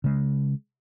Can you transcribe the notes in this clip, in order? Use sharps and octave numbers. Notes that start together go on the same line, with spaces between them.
C#3 G#3